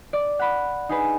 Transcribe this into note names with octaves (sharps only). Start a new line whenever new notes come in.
D5
F#5 B5
D#4 G#4 B4